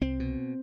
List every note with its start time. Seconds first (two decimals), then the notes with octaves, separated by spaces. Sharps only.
0.01 C2 C4
0.20 B2